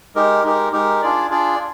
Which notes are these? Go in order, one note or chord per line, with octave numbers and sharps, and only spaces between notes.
G#3 D#4 G4 A#4
G#3 D#4 G4 A#4
G#3 D#4 G4 A#4
D4 F4 G#4 D5
D4 F4 G#4 D5